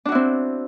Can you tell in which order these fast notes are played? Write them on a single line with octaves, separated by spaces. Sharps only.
D4 F#4 E4 C4